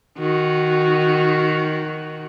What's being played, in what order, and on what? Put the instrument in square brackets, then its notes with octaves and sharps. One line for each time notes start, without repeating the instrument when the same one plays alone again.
[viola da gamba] D#3 F#4